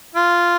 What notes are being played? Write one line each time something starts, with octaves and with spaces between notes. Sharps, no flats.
F4